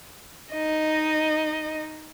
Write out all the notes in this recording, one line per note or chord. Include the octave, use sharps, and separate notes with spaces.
D#4 D#5